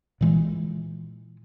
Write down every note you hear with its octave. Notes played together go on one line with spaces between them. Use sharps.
A#2 E3 G#3